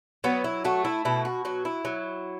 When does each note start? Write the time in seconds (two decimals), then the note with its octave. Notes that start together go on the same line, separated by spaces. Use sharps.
0.24 F#3 B3
0.44 E4
0.65 A3 F#4
0.85 E4
1.05 B2 E4
1.25 F#4
1.45 F#3 F#4
1.65 E4
1.85 F#3